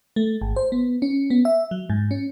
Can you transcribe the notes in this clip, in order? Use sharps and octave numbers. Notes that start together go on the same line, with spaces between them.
A3
G#1
C5
B3
C#4
B3
E5
F#3
G#2
C#4